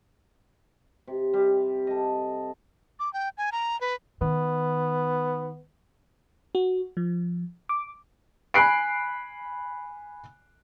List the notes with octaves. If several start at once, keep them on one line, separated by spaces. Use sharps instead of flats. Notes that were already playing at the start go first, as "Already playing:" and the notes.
C3
G3
A4 D#5
D6
G5
G#5
A#5
B4
D#3 B3
F#4
F3
D6
G#5 B5 F#6 C7 D7